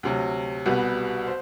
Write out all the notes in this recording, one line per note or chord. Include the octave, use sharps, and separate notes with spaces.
D2 C3 F#3
C2 B2 G3 B3
C5